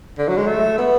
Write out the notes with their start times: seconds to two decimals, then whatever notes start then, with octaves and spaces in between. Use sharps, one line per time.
0.19 D3
0.28 F#3
0.37 G#3
0.47 A3
0.78 B3